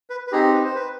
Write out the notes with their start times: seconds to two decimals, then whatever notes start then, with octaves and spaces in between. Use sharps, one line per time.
0.10 B4
0.27 B4
0.32 C4 D#4 G4 G#4
0.54 B4
0.65 C5
0.76 B4